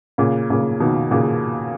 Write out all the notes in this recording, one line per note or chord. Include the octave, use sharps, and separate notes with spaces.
A#2 C#3
A#2 C#3
B2 D#3
A#2 C#3